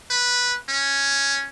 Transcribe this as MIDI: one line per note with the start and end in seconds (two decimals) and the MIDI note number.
0.10 0.56 71
0.69 1.46 61